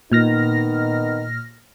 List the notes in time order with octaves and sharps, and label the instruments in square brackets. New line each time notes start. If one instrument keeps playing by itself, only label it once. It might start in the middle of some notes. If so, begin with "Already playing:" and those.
[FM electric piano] A#2 F6 A#6 [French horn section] D#3 B3 D#4